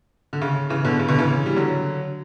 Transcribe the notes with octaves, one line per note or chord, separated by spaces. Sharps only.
D3
C#3
C#3 E3
B2 D3
C#3
B2 D3
C#3 E3
G3
D3 F#3